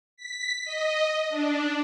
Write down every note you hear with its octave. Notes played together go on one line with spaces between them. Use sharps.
B6
D#5
D4